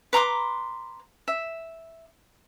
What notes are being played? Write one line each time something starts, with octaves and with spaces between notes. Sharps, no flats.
B4 A#5 C6 D6
E5